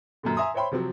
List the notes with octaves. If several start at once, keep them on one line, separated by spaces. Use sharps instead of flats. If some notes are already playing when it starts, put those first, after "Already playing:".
F#2 A#2 D3
E5 G#5 A#5 C6 D#6
C5 C#5 E5 G5 B5 C6
C3 F3 F#3 C4